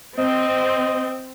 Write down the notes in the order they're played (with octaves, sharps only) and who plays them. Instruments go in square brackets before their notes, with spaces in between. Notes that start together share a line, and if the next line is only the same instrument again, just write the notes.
[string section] C4 [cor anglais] D#5